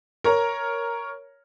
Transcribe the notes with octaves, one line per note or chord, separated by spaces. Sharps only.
A#4 C#5 A#5